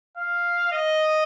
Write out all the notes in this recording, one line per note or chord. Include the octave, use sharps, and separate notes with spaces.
F5
D#5